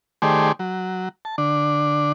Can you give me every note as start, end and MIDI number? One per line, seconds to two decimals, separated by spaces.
0.22 0.52 51
0.22 0.52 57
0.22 0.52 67
0.22 0.52 68
0.22 0.52 72
0.22 0.52 74
0.59 1.09 54
1.25 1.36 81
1.38 2.12 50
1.38 2.12 62